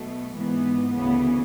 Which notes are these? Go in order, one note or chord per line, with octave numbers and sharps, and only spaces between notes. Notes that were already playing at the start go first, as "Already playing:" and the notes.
Already playing: B1 B2 A3
G#1 G#2 E3 B3
D2 C#3 E3 B3